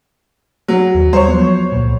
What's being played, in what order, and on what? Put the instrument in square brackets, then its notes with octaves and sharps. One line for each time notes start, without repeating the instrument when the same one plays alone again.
[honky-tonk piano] F#3
[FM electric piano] D#2
[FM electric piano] G3 [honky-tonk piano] C5 C#5
[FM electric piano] F3 F#3 B3
C#2 A#2